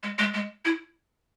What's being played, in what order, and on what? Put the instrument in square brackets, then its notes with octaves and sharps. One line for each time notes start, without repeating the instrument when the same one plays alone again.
[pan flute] G#3
G#3
G#3
E4